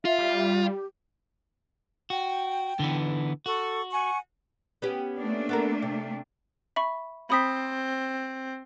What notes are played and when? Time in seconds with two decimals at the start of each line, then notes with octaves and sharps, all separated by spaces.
0.05 F4 E5
0.19 G3
0.68 G4
2.10 F#4 G5
2.79 D3 E3 B3
3.46 F#4 A4 C#6
3.92 F#5 G#5 C#6
4.82 B3 C#4 G4
5.16 A3 A#3 D4
5.49 B3 A4 A#4
5.82 C3
6.76 E5 B5 C#6
7.30 C4 B5 D#6 B6